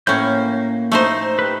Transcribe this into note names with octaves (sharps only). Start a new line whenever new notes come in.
A2 A#3 C#4 G6
A3 D#4 C5
G4 B4